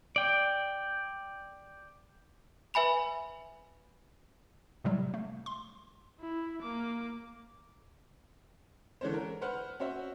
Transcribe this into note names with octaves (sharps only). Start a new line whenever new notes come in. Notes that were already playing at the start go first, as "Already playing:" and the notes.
D5 G5
B4 E5 G#5 B5 F7
A2 C3 F#3 G3
A3
C6
E4
A#3 D6
D3 E3 G#3 C#4 C5
A#4
B4 C5 F#5 F6
C#4 F#4 C5 E5